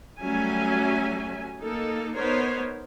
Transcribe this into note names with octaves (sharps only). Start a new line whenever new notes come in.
F#3 G3 A3 C#4 E5 G#5
A#3 D#4 A4
B3 D#4 A#4 C5 C#5